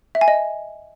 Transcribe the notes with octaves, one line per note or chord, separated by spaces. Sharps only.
E5
G#5
D#5